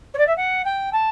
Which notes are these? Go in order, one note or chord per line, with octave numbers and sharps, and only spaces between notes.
C#5
D5
E5
F#5
G5
A5